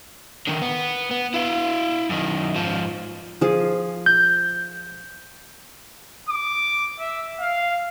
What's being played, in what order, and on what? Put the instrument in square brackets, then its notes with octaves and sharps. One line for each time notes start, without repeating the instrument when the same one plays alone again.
[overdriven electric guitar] D3 D#3
B3
B3
E4 F5
F#2 D#3
G#2 F3
[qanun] F3 G#4
[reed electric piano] G6
[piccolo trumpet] D6
E5
F5